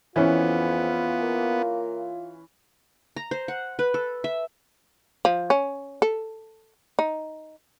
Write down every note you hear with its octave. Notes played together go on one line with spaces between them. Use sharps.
F2 E3 B3 C#4 F4
A#3
A#5
C5
F#5
B4
A4
E5
F3
C#4
A4
D#4